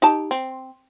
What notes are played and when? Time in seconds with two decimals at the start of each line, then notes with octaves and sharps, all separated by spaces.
0.02 D#4 G4 A5
0.31 C4